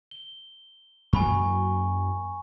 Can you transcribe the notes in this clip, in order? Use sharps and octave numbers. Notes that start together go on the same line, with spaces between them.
G7
F#2 F#3 A#3 G#5 B5 C#6